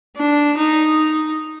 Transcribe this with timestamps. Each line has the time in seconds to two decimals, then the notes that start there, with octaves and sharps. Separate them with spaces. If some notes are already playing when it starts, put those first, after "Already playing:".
0.17 D4
0.57 D#4